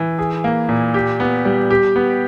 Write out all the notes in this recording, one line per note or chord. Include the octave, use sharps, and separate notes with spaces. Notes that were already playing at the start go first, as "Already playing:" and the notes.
Already playing: E3
G#4
A#3
A#2
G4
B3
G3
G4
B3